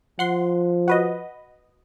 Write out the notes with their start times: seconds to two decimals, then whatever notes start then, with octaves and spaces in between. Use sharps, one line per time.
0.19 F3 F#5 C6
0.88 F#4 B4 D#5